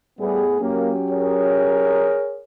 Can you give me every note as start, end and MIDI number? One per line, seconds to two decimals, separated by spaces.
0.19 0.58 45
0.19 0.44 55
0.19 0.44 57
0.19 0.58 59
0.19 0.58 68
0.60 2.17 54
0.60 0.91 58
0.60 2.17 61
0.60 2.17 67
1.10 2.42 68
1.10 2.42 70
1.10 2.42 73